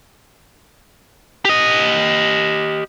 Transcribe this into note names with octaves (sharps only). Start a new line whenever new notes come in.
G4 D#5